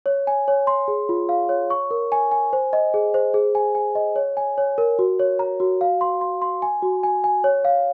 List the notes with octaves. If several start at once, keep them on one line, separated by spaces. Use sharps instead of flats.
C#5
G#5
C#5
C6
G#4
F4
F5
C#5
C#6
A#4
G#5
G#5
C5
D#5
G#4
C5
G#4
G#5
G#5
D#5
C#5
G#5
C#5
A#4
F#4
C#5
A#5
F#4
F5
C6
C6
C6
G#5
F#4
G#5
G#5
C#5
F5